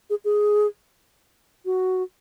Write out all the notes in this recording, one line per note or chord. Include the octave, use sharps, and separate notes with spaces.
G#4
G#4
F#4